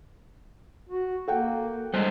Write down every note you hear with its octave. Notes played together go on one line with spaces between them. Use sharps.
F#4
A#3 A4 F#5 G5
G2 G3 G#3 C5